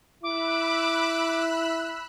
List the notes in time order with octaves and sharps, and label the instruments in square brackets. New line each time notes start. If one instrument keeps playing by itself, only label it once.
[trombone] E4 [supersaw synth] B5 E6 F#6 [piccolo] D6